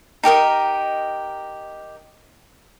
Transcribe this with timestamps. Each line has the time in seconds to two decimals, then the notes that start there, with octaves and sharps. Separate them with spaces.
0.23 D#4 G4 A#4 D#5